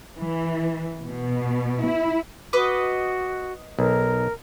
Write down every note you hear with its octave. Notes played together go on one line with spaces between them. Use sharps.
E3
B2
E4
F#4 B4 D#5 D6
B1 A#4